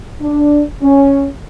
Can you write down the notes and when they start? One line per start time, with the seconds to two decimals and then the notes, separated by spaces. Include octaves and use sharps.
0.21 D4
0.82 C#4